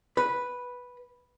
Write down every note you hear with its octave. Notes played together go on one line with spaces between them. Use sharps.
B4